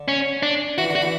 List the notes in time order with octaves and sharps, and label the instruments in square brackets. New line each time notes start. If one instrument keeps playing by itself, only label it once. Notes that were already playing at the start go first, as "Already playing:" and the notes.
Already playing: [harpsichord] D3
[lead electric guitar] C#4
D4
[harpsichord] E3 [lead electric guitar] F#4
[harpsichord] D3
[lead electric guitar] F#4
[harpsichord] E3